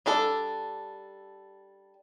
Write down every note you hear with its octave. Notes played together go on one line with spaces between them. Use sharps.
G3 D4 A4